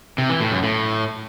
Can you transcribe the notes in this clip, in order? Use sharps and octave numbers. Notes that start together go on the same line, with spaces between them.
C3
E3
A2
F#2
A2